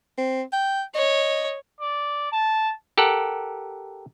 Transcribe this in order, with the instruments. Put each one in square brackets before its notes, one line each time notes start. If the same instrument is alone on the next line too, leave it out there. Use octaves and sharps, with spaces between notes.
[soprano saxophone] C4
G5
[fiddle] C#5 [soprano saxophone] D#5
[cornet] D5
A5
[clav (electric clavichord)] G4 A4 A#4 F#5